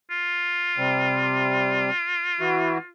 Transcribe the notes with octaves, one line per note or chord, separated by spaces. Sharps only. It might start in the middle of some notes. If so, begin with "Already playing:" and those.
F4
C3 G3 C4
E3 E4 F#4